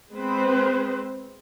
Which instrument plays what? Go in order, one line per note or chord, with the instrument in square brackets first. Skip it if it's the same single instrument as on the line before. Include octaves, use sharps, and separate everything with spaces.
[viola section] G#3 B3 C4 B4 C5